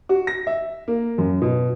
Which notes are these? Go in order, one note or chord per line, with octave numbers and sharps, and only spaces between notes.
F#4
A#6
E5
A#3
F#2
B2